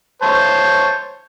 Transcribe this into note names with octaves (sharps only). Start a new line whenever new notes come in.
C5 C#5 A5